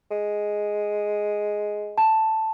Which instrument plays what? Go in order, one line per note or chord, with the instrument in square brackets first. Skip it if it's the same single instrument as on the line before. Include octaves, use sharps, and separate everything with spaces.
[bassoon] G#3
[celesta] A5